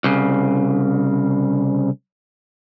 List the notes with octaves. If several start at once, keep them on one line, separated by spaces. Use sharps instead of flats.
C2 C#3